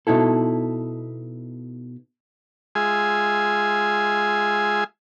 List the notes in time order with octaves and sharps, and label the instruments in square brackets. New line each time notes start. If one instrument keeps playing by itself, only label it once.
[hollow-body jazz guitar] B2 D#4 E4 A4
[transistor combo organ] G#3 F4 G#4 E5 G#5